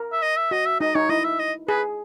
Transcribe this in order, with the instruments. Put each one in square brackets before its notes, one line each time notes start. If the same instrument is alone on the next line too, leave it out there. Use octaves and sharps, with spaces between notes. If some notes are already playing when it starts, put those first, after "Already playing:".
Already playing: [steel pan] A#4
[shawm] E5
D#5
E5
[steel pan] F#4 [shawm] D#5
[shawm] E5
[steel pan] D#4 [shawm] D#5
[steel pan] D#4 [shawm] C#5
[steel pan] E4 [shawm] D#5
[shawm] E5
D#5
[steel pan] G#4 [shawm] B4